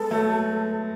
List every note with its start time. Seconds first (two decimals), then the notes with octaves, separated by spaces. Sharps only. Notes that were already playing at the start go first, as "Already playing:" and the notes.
Already playing: G#3 B3 A4
0.11 F#3 A3